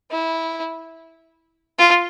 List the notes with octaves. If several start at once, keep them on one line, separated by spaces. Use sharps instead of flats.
E4
F4